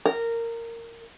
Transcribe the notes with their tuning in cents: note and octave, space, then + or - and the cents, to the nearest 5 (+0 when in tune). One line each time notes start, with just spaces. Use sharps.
A#4 -15